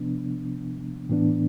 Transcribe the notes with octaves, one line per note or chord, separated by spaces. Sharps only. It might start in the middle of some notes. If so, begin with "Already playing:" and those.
Already playing: C3 F3 B3 D4
A2 E3 B3 D4